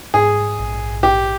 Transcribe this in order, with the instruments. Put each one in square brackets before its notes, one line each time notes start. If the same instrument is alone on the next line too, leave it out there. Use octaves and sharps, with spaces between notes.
[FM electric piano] G#2 [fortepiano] G#4
[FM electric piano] A#1
[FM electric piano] A#1 [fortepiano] G4